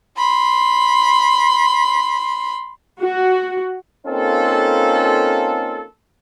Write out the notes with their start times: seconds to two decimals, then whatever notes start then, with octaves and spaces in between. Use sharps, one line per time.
0.18 B5 C6
3.00 F#4
4.07 A#3 C4 C#4 D#4 F4 A4